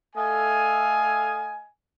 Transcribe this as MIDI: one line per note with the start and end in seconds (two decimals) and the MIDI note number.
0.15 1.63 57
0.15 1.63 69
0.15 1.63 75
0.15 1.63 77
0.15 1.63 80